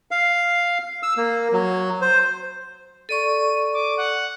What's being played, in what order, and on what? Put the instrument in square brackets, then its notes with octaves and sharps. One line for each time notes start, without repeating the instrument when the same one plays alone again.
[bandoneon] F5
E6
A#3
F#3
C5
[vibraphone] A4 D5 C#6 [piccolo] D#7
[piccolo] D6
F#5